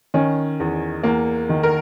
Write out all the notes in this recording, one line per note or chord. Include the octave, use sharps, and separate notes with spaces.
D#3 C#4
E2
E2 A#3
D#3
A#4